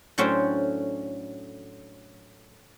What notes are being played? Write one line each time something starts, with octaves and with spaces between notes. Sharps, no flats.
A2 F#3 C#4 D4 C5 G5